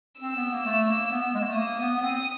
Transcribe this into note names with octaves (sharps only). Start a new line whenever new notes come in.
C4 E6
B3
A#3
A3
A#3
B3
B3
G#3
A#3
A3
A#3 D#6
B3
B3
C4